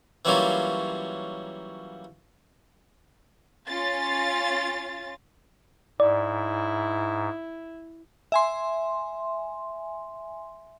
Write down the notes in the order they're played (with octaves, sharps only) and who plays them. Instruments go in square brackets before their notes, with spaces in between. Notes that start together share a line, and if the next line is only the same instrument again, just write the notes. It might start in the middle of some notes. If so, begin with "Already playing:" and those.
[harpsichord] E3 F#3 G3 A#3 C#4 F4
[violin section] C#4 F4 A6
[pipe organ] G#2 [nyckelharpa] E4 [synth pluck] D5
[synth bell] E5 G#5 C6